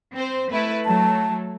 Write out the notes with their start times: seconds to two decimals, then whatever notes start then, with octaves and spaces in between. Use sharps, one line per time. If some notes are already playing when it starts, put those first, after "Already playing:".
0.14 C4 C5
0.52 A3 E4 B4
0.85 F#3 A3 A5